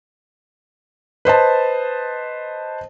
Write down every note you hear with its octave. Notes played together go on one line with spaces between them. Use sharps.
B4 C5 D#5 A5